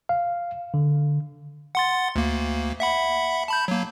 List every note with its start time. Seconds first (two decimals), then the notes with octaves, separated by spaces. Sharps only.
0.09 F5
0.74 D3
1.75 F#5 C6 A6
2.16 D2 A#3
2.80 E5 F#5 B5
3.48 A5 B5 G6
3.68 F#3 A#3